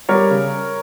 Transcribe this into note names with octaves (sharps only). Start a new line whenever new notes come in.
G3 A#4 C#5
C#3